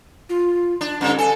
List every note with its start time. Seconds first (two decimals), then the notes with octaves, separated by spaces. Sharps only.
0.29 F4
0.81 D4
1.01 G2 D3 C#4
1.18 A4 G#5